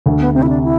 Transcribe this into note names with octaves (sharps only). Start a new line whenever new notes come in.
D2
B3
C3 C4
E4
D4
E4